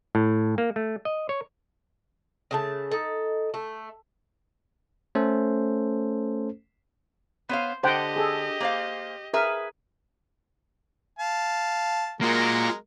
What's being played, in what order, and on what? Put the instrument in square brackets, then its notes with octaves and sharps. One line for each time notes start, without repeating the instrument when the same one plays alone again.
[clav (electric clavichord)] A2
A#3
A3
D#5
C#5
[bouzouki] C#3 A3 A5
D#4 A4
A3
[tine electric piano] A3 C#4 A4 C5
[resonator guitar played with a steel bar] B3 C#5 F5 [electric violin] C5
[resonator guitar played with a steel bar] D3 [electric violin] G4 D#5 [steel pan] C5 F#5 G5
[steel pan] G#4 A4
[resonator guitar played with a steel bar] A#3 C5 F5
[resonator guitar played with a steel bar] G#4 B4 E5 [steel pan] A#4
[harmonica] F5 A5
[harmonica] F#3 G#3 A#4 [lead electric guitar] A#3 F4